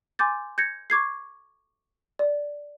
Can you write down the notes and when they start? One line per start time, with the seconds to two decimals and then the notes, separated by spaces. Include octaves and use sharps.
0.19 G#5 C6 D6 G6 A6
0.58 G6 G#6 A#6 C#7
0.90 C#6 D6 G#6 C7
2.19 D5